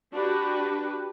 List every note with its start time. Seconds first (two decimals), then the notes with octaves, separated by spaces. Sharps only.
0.13 D4 F#4 G4 B4